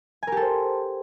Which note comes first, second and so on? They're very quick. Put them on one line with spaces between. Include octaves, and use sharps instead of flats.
G#5 A#4 G4 A4 C5